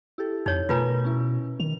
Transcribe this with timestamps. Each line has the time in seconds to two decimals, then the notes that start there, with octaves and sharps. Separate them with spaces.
0.18 E4 G4 A4
0.46 F2 D#4 C#5
0.69 B2 A3 F4 A#4 B4 G#5 A#5
1.05 C#4 E4
1.60 D#3 F7